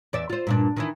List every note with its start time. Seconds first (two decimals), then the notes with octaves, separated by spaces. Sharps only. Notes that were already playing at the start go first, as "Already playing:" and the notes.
0.13 E2 D5 E5
0.30 F4 C5
0.47 G2 A#2 D4
0.76 D#3 E3 E4